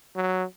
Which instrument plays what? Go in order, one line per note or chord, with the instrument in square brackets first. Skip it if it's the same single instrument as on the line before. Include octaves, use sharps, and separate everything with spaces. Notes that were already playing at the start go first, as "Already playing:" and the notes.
[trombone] F#3